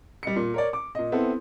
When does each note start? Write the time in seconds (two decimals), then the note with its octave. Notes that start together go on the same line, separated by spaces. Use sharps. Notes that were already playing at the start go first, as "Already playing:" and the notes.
0.23 G3 D#5 C#7
0.36 A#2
0.54 A#4 C#5 D5
0.73 D6
0.95 A#2 D#5
1.12 B3 C4 E4 A4